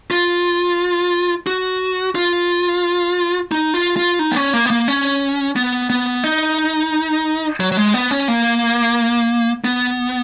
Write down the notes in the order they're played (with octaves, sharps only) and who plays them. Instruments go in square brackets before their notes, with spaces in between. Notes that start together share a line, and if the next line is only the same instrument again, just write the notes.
[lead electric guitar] F4
F#4
F4
D#4
F4
F4
D#4
B3
C#4
A#3
B3
A#3
C#4
B3
B3
D#4
F#3
F#3
G#3
B3
C#4
A#3
B3